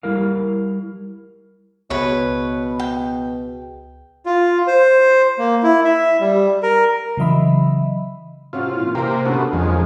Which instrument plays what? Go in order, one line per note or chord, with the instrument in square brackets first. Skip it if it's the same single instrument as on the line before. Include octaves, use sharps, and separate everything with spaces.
[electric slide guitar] G3 E4 A#4 F5
[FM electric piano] C#2 G#4 [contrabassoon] B2 [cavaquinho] B4 C#5
[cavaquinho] G5
[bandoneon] F4
C5
A#3
E4
E5
G3
A#4
[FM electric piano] C#3 E3 F#3 D#5 E5 B5
[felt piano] C3 C#4 F#4 [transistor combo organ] F4
[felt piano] A#2 E3
[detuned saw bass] C3 [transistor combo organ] A#3 A#4 C5 [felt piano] G5 A#5
[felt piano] D3 C#4 [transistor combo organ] A3 B3 F#4
[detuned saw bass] F2 [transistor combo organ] D#3 F3 G#3